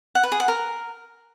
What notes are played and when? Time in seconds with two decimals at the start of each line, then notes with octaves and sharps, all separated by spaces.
0.15 F#5
0.23 B4
0.32 G#4
0.40 F#5
0.48 A#4